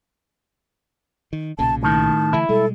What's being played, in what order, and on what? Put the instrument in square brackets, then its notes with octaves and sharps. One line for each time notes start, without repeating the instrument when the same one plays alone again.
[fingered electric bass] D#3
[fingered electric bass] B1 A#2 C#3 [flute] A5
[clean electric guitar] A2 D#3 [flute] A5
[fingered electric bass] D3 E3 A3 [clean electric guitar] E4
[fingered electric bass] B2 G3 G#3 [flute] A4